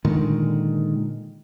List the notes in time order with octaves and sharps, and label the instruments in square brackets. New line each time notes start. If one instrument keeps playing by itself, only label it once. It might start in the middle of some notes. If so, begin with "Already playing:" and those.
[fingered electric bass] A#2 D3 D#3 G#3